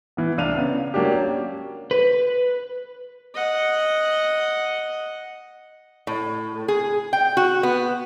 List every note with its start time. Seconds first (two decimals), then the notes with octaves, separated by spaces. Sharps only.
0.17 E3 B3
0.38 C2 D4 F5 D#7 F7
0.57 C#3 B3
0.94 F#3 A#3 D4 G4
1.12 C#4
1.91 B4
3.34 D#5 F#5
6.07 A2
6.68 G#4
7.13 G5
7.37 F#4
7.63 B3